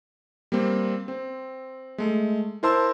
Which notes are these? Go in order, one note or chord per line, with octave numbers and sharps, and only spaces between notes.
G3 A#3 C4
C4
G#3 A3
E4 A#4 C5 A5 C6 E6